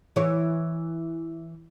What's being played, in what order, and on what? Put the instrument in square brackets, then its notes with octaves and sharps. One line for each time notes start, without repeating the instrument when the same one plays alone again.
[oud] E3 C#5